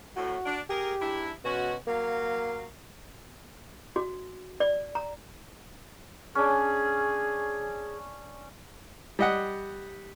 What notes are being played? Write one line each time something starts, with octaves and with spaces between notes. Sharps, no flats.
D2 A2 F#4
D4
G4 G#4 A#4
G#2 D4 E4
B2 G#3 C#4 F#4
F#3 A#3 F5
F#4
D5
A#5
C#4 D4 G#4
G3 D#5 F#5